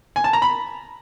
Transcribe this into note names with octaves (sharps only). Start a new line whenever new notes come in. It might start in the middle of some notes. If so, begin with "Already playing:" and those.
G#5
A5
A#5
B5